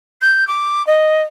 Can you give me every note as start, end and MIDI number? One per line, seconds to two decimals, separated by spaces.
0.21 0.47 91
0.47 0.85 86
0.86 1.22 75